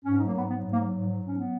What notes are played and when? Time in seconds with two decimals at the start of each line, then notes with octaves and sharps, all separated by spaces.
0.05 G#2 C#4
0.16 D#4
0.20 F#3
0.27 A#3
0.34 G#2 B3
0.49 F#3 B3
0.65 G#2
0.72 A#3
0.79 F#3
0.93 G#2
1.08 F#3
1.23 G#2 C#4
1.38 F#3 B3